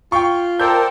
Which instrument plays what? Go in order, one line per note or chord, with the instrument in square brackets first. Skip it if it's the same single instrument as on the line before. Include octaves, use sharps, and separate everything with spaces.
[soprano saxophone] F4 [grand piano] G5 C#6
[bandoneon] A4 C5 D5 [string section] A#4 G5 A5 [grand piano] G6